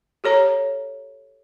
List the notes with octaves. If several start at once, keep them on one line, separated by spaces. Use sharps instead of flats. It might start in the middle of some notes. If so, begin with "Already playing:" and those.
G4 A4 C#5 A#5